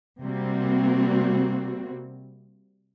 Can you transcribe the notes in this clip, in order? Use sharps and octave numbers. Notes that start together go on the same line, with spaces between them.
C3 G3 A#3 C4 F#4